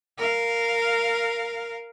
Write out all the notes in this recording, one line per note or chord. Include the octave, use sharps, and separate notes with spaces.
A#4 F5